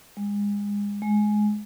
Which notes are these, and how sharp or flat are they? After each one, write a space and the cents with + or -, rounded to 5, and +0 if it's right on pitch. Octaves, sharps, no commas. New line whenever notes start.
G#3 -30
G#3 +15